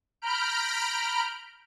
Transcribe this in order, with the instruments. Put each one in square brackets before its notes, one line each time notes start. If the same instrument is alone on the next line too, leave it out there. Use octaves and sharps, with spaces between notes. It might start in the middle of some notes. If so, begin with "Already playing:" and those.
[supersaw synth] A#5 B5 F6 G6 D7